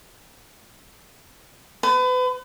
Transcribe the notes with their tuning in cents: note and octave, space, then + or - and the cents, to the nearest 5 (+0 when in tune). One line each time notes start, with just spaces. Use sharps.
B4 +35